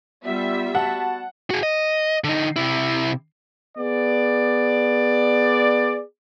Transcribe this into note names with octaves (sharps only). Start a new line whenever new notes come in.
G3 B3 F4 E5
B3 F#4 F#5 A5
F#4 G#4
D#5
D3 D#4
C3 E4
B3 G#4 D5